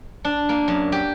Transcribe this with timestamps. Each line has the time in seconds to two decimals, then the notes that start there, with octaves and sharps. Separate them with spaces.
0.25 D4
0.49 A#3
0.68 F#2
0.92 G4